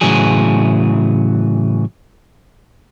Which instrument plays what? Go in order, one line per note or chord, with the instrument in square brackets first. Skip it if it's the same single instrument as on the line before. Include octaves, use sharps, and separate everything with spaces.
[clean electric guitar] A2 C#3 E3 F#3 G#4